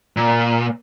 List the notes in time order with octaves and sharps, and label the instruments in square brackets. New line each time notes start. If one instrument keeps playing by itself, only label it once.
[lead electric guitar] A#2